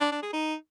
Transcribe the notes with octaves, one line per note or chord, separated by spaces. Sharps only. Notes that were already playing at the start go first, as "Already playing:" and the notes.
D4
D4
G#4
D#4